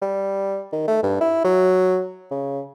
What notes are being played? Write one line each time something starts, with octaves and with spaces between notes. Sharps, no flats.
G3
D#3
A3
G2
E4
F#3
C#3